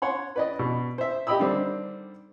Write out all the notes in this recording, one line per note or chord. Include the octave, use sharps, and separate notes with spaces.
C#5 F#5 C6
B4 D5 D#5
B2
C5 E5
G4 D#5 G5 B5 D#6 E6
D3 D#3 G3 C4 D4